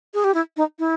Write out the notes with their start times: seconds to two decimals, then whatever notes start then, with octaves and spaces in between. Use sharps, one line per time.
0.14 G#4
0.24 G4
0.34 E4
0.57 D#4
0.79 E4